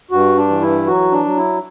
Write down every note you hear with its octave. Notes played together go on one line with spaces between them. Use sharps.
G2 F#4
D4
E3
E4
F#3 F#4
D4
F#3
E4